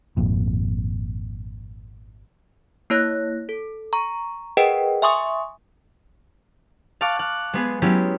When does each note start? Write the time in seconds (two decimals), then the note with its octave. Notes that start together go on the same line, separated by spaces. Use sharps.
0.17 G#1 F2 A#2
2.90 A#3 E4 C#5 F#6 A#6
3.49 A4
3.93 A#5 C#6
4.57 G#4 A#4 B4 D#5 F#5 G5
5.02 E5 G#5 C6 C#6 D#6
7.01 F5 A5 C#6 D6 F#6
7.19 F5 F#6
7.54 G#3 B3 G#4
7.82 F#3 G#3 B3 C#4 E4 G4